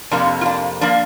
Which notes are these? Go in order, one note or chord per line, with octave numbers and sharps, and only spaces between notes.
F2 C3 A#3 D4
F4
D4
F3 A#3 D4